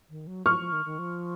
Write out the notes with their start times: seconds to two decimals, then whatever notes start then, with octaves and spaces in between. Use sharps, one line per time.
0.10 D#3
0.27 F#3
0.46 F3 C#6 F6
0.59 F3
0.72 D#3
0.85 D#3
0.99 F3